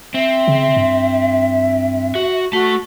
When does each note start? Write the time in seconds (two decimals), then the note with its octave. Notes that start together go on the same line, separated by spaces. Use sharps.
0.14 C4 E5
0.48 C#3
0.77 G2
2.15 F#4
2.53 A3 F#4 A5